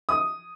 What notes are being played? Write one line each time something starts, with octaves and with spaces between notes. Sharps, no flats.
D#6